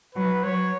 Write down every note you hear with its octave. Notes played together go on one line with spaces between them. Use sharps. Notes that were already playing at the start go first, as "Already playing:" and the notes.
F#3 B4
F#3 C#5